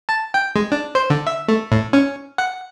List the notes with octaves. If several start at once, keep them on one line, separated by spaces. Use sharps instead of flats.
A5
G5
G#3
D4
C5
D3
E5
A3
A2
C#4
F#5